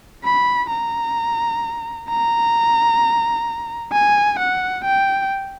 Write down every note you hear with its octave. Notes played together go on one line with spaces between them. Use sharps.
B5
A#5
A#5
G#5
F#5
G5